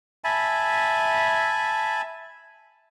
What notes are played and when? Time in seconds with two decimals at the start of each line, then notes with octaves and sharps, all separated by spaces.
0.24 E5 G#5 A5 B5